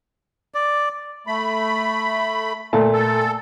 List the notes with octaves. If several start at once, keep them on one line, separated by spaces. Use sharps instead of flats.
D5
A3 B5
A#2 A3 A5
A4